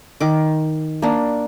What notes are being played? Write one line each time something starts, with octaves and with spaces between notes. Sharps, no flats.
D#3 D6
A#3 D4